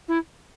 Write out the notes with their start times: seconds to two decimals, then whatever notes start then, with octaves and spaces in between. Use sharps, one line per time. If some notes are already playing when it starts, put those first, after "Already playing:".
0.08 E4